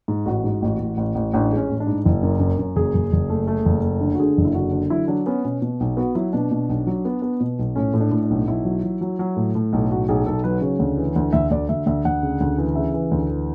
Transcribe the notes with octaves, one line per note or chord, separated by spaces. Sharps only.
G#2
A1 F#4
G#2
A1
A1
A1
A1
A1 D4
G#3
C#4
A1
D4
G#2
F#1 E4
F#2
F#2
F#2
F#1 G#4
F#1
F#1
A3
A3
F#1
A3
D3
F#4
D3 G#4
F#1
E4
D3 F#4
D3
F#3 E4
F#3 D4
B3 C#4
B2 C#4
B2
B1
B3 F#4
F#3 E4
B2 D4
B2
B1
F#3
B3
B3
B2
B1
A2 C#4
A2
D4
A2
D4
B1
B1 E4
F#3
F#3
F#3
F#3
A2
A2
B1
A2 F#4
B1 G#4
B1 A4
F#3 B4
C#3 C#5
D2
E3
D2
D2 E5
D2 D5
D2 E5
D2 E5
D2 F#5
C#3
D2
E3
C#3 E5
E3
D2
E3